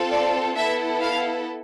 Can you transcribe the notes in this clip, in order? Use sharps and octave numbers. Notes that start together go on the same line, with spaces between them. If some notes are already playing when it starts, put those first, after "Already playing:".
Already playing: C4 F4 A4
D5
B3 E4 A4 E5
F5